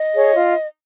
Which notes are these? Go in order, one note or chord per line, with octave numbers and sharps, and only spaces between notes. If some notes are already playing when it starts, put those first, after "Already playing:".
Already playing: D#5
G#4 C#5
F4